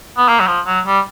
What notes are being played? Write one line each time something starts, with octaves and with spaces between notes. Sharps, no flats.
B3
A#3
F#3
F3
F#3
G3